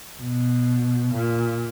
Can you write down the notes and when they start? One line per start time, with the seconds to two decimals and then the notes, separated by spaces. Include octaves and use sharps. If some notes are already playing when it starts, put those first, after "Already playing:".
0.20 B2
1.13 A#2